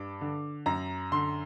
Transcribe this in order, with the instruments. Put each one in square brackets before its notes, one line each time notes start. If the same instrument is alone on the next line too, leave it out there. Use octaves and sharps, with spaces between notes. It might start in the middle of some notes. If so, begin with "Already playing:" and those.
Already playing: [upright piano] G2 D6
D3
F#2 A#5
D3 C6